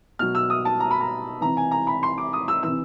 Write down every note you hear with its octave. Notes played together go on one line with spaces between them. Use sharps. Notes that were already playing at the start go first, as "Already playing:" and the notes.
B2 F#3 F6
E6
D#6
A5
A#5
B5
A#5
C3 E3 A#5
G#5
A#5
B5
C6
D6
D#6
E6
C3 E3 E6